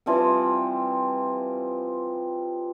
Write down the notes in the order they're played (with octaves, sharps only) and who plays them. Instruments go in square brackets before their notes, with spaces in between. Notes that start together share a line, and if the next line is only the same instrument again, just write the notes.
[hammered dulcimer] E3 F3 G3 C4